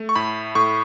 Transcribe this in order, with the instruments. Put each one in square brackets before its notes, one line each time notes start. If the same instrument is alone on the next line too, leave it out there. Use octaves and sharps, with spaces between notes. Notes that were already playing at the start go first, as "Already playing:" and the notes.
Already playing: [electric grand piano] A3
C#6
A2 B5
A2 C#6